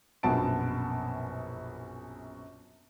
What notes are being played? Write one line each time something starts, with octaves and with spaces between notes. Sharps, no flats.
A#1 F#2 B2 F#5 A5 D7